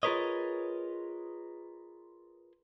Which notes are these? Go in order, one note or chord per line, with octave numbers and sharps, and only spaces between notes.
F4 G#4 A#4 B4 C#5 D#5